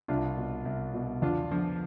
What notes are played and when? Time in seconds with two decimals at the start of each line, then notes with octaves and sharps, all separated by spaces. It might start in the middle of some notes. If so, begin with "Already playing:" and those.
0.08 C2 D4 F4
0.37 B2
0.65 C2
0.94 B2
1.22 E2 D4 F4
1.51 D3 F3